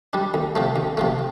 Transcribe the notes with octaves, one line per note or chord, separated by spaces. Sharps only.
G3 D4
D2
C3 F3 A3
D2
C3 F3 A3